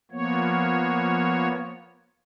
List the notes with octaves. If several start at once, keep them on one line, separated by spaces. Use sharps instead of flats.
F3 A#3 B3 C#5